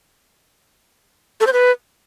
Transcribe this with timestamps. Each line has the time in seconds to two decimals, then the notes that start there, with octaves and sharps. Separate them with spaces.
1.41 A4
1.47 C5
1.53 B4